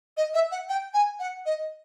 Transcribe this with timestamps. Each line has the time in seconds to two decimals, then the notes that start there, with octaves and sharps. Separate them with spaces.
0.17 D#5
0.34 E5
0.51 F#5
0.69 G5
0.94 G#5
1.19 F#5
1.46 D#5